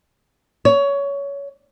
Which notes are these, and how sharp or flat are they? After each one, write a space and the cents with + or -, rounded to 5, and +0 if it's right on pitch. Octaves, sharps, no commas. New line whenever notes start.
C#5 +20